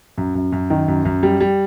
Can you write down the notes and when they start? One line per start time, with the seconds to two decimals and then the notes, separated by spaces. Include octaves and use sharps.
0.18 F#2
0.35 F#2
0.52 F#2
0.70 D#3
0.88 F#2
1.05 F#2
1.23 G3
1.40 G3